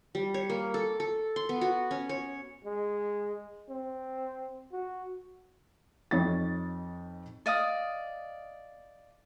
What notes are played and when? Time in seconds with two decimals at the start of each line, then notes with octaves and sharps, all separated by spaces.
0.15 G3
0.34 C#5
0.50 A#3
0.74 A4
1.00 A4
1.36 C6
1.49 B3
1.61 F#4
1.91 C#4
2.09 C#5
2.64 G#3
3.69 C4
4.72 F#4
6.11 F2 D#4 C#5 A6
7.46 D5 D#5 F5 D#6